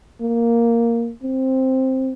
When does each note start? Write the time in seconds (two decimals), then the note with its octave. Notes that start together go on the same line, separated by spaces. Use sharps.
0.21 A#3
1.23 C4